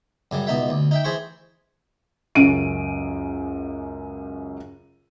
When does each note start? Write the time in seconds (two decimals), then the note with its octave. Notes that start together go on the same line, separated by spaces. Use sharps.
0.31 F#2 C#3 G3
0.47 C#2 B2 D#4 E5
0.70 D2
0.91 D#4 E5 G5
1.05 E3 G#4 C5 E5 C#6
2.35 C#2 F#2 C#4 D7 D#7